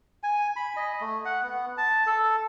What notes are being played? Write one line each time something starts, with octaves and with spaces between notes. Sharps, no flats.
G#5
B5
D#5
A3
F#5
B3
A5
A4